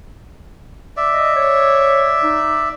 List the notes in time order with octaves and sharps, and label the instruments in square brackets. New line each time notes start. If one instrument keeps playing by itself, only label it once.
[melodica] D5 E5
[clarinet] D#5
C#5
D#4